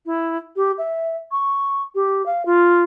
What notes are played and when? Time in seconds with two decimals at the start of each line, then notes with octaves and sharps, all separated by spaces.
0.06 E4
0.56 G4
0.78 E5
1.32 C#6
1.95 G4
2.26 F5
2.46 F4